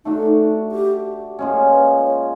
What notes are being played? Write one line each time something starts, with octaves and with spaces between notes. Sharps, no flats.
A3 D4 D#4 F#4
G4
A#2 F3 G#3 C#4
B4
C#5